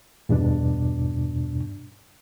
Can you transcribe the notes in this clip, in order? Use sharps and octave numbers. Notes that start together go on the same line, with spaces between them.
E2 G2 B2 D4